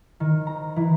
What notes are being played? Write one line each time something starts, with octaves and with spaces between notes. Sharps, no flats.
D#3
A#5
E3